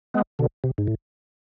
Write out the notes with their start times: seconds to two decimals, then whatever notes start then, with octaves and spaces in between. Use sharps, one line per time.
0.14 G#3 B3
0.39 B2 D3
0.64 C3
0.78 G#2
0.87 A2